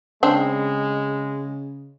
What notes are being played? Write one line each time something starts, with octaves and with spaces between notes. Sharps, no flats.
C#3 G#3 C4 D4